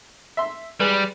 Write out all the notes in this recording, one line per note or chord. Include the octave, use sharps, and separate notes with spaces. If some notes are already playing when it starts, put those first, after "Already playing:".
E5 C6
G3 G#3 B4